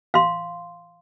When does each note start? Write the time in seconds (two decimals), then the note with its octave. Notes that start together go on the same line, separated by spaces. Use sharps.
0.14 F5 C6